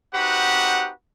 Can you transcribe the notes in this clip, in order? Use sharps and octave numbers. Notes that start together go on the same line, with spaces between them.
C4 D#4 F#4 G4 B4 F#5